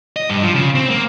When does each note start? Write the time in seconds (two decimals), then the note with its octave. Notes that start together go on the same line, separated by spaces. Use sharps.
0.16 D#5
0.30 G2
0.43 F3
0.54 C#3
0.75 C4
0.90 A#3